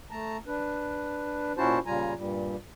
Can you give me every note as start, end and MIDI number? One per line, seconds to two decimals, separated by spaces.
0.11 0.37 57
0.11 0.37 81
0.11 0.37 82
0.47 1.52 62
0.47 1.52 71
1.57 1.79 46
1.57 1.79 61
1.57 1.79 64
1.57 1.79 66
1.57 1.79 72
1.57 1.79 81
1.86 2.14 46
1.86 2.14 49
1.86 2.14 55
1.86 2.14 65
1.86 2.14 80
1.86 2.14 82
2.16 2.56 43
2.16 2.56 46
2.16 2.56 55